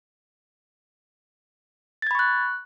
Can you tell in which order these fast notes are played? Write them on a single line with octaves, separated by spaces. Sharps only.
A6 G#6 B5 C#6 F#6